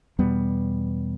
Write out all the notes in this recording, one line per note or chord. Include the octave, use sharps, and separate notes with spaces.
E2 B2 G3 B3